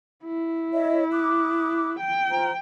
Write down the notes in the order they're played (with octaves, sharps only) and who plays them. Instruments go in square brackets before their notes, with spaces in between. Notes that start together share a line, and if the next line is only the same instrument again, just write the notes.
[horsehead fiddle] E4
[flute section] C#5 D#5 E5
D6 D#6 F#6
[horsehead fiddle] G5
[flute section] F4 C5 A#5